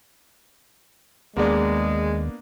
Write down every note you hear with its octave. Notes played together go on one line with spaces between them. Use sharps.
D#2 G#3 A#3 B3 D4